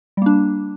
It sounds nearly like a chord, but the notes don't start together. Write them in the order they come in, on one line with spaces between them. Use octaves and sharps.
G3 A#3 D4